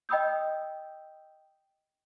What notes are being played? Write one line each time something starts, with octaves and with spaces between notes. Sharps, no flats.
D#5 G5 B5 D#6 E6 G6